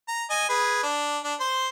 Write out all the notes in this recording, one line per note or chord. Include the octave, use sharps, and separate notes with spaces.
A#5
D#5 G#5
G#4 B4
D4
D4
C5 C6